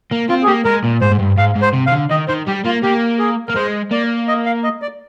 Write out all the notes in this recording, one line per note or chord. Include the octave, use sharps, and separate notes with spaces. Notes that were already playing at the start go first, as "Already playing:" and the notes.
A#3
C4 F4
G#4
A#3 G4
G#3 A#4
A#2
G#2 C5
G#2
G2
G#2 F5
G#2
C5
C3
C3 F5
D3
D#3 D#5
D#3 C5
G3 G4
A#3 F4
A#3 G4
G#4
A#3 A#4
G#3 C5
A#3 D5
D#5
F5
D#5
D5